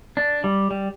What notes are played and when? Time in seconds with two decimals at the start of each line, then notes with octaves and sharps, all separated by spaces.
0.17 D4
0.44 G3
0.71 G3